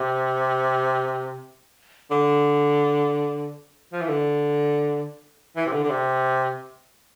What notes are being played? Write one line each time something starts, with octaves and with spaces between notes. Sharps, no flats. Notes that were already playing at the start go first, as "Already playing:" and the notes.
Already playing: C3
D3
F3
E3
D3
E3
C3
D3
D3
C3